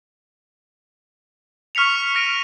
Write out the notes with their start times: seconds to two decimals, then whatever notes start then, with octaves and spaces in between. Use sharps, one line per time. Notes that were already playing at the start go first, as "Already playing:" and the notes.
1.75 C#6 F6 B6 C#7 F7
2.15 F6 A#6 D7 D#7